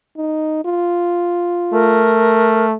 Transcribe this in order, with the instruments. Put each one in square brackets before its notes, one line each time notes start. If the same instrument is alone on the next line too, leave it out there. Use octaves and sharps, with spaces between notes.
[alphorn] D#4
F4
[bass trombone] A3 [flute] A#4